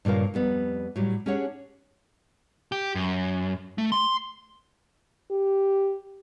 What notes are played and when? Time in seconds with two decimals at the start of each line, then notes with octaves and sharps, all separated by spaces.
0.05 G2 A#2 C#3 A#4 F5
0.34 F2 G3 B3
0.96 A2 F#3 G3
1.26 C#4 D4 G4 G#4 C#5 F#5
2.72 G4
2.95 F#2
3.78 A3
3.92 C6
5.31 G4